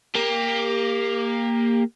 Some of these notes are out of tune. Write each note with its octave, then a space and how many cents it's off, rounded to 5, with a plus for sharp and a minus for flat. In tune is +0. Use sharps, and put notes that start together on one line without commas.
A#3 +0 G4 +25